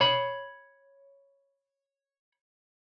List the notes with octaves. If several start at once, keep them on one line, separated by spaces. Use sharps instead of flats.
C#5 B5